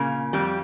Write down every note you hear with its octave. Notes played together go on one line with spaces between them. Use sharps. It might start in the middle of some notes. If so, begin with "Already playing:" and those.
Already playing: A#2 C#3 A#3
F2 G3 G4